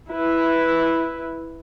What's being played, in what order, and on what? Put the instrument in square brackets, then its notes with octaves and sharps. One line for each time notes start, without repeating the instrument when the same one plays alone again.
[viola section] E4 B4